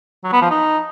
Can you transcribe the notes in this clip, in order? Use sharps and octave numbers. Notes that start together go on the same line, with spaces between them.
F#3
B3
F3
D#4